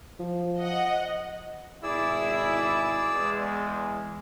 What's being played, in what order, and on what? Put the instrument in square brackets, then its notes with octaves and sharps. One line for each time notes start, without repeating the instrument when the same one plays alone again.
[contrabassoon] F3
[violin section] D#5 F#5
[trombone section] G#1 B2 E4 [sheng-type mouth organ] G#4 D5 E6
[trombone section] E2 G#3